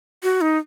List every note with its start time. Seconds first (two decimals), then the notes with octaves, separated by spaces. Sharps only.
0.23 F#4
0.41 D#4